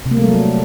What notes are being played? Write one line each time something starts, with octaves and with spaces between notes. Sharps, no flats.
C3
A#3
A3
G3
F#3